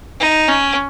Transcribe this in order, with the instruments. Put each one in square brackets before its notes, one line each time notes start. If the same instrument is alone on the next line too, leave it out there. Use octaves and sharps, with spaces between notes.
[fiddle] D#4
C#4